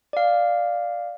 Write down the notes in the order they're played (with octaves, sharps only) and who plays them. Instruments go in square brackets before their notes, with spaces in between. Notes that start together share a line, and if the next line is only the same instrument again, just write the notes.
[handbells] D5 F5